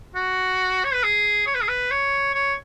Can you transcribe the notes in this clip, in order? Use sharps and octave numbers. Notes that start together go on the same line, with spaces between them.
F#4
C#5
B4
G#4
C#5
B4
G#4
B4
C#5
C#5